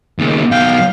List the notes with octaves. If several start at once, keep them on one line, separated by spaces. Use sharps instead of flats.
D#2 C#3
B1 F5 G5